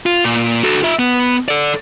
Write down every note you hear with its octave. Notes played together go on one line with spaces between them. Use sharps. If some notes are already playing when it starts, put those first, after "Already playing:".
F4
A#2
F#4 A4
F4 E5
B3
A4 D5